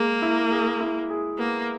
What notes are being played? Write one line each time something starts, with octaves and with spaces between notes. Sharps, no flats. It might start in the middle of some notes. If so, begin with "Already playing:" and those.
Already playing: G#3 A#3
E4
G#4
E4
G#4
A#3 B3